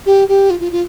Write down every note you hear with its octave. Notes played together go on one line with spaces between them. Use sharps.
G4
G4
F4
F4
F4